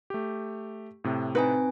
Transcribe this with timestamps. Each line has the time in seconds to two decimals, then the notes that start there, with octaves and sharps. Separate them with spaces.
0.10 A3 G4
1.04 A2 C3
1.35 C4 D#4 B4 G#5